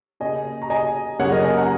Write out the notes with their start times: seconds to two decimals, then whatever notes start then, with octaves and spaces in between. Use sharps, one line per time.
0.20 C#3 A#3 D#5 G#5
0.62 A#5
0.70 D#5 G#5
1.19 F#2 C#3 A#3 C#5 F#5
1.32 A#4 D#5
1.44 D#5 G#5
1.57 F#5 A#5